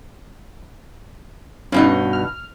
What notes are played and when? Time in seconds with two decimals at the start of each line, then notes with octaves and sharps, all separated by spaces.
1.72 G2 B2 C#4 D#4
2.13 F6